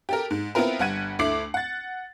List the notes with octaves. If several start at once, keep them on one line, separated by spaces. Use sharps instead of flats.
G4 A4 A#4
G#2
B3 C4 E4 F4 A#4 B4
G1 G3 F#5 G#6 D#7
D2 A3 E4 D6 C7 F#7
F#5 A6